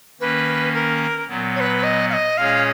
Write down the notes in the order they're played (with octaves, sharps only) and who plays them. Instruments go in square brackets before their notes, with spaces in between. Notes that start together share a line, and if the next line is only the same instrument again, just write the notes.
[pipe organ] D#3 A#3 C#4 [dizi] B4
[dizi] A#4
[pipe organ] A#2 F#3 B3
[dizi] C#5
B4
D#5
F5
D#5
[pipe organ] A#2 G#3 C#4 G#4 C#5 [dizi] F5